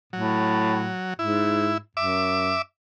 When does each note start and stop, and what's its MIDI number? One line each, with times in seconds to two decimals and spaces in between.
0.13 0.93 45
0.13 1.14 54
1.19 1.77 44
1.19 1.78 64
1.97 2.57 42
1.97 2.62 76
1.97 2.62 86